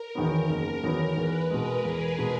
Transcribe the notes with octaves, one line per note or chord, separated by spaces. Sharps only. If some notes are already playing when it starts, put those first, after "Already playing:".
Already playing: A#4
E2 D#3 F#3 B3
F#1 A#4
E2 D#3 F#3 B3
E2 B4
B2 G#3 A#4
E2 G#4
B2 G#3